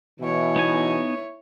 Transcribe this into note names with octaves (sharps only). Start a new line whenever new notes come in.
B2 E3 E4 C#5
B3 D#4 G#5